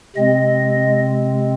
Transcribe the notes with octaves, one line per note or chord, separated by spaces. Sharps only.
C3 G#3 C4 D#5